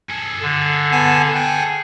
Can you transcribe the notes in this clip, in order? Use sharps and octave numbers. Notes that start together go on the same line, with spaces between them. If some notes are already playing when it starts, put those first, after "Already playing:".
G#4 A4
D3
B3 G#5 A5
G5 G#5